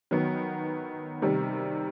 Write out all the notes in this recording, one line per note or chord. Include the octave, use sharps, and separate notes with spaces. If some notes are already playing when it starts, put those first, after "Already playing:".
D#3 F#3 B3
C3 D#3 G3